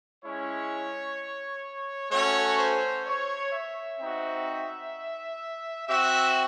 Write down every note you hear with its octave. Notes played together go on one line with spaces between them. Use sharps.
G#3 C#4 E4 C#5
A3 C#4 F#4 C#5
C5
C#5
E5
C4 D#4 F#4
C4 F#4 E5